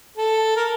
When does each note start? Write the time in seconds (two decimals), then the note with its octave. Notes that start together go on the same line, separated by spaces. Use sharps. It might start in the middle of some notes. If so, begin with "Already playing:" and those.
0.17 A4
0.56 A#4